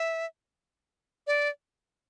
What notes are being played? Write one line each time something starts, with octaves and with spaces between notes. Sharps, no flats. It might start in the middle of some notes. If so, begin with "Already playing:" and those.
Already playing: E5
D5